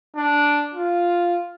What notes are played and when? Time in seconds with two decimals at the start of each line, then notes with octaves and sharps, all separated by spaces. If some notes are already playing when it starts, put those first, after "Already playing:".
0.16 D4
0.75 F4